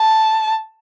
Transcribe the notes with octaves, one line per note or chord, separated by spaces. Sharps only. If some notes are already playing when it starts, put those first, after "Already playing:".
Already playing: A5